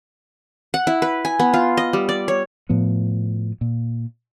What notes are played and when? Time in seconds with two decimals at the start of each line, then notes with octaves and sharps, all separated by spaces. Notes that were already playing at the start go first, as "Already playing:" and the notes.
0.74 F#5
0.87 E4
1.02 B4
1.25 G#5
1.40 B3
1.54 F4
1.77 D#5
1.93 G3
2.09 D5
2.28 C#5
2.69 A2 F3 B3
3.61 A#2